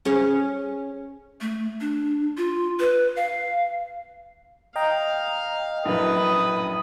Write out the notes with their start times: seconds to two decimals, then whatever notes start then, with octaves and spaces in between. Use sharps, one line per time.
0.05 C#4 G#4 C#5
1.41 A3
1.81 D4
2.37 F4
2.80 B4
3.16 F5
4.76 D#5 F5 G5 A#5
5.85 A#1 F#2 A2 B4 D#6